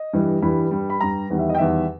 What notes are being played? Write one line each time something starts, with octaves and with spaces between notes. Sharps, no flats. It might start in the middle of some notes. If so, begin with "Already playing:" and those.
Already playing: D#5
G2 E3 G3
G2 E3 G3 B5
G2 G3
B5
G2 G3 A#5
E2 D#3 G3
E5
D#5
G5
E2 D#3 G3 E5